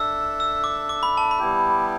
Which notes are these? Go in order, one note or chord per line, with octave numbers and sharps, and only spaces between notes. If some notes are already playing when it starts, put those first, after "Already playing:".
Already playing: D4 A4 E5 E6
E6
D6
D6
B5
A5
B5
G3 B3 E4 G4